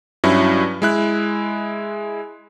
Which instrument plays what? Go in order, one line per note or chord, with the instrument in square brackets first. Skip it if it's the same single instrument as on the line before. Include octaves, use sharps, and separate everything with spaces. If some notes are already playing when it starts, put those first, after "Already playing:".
[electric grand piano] G2 F#3 C#4 E4
G#3 E4 F#6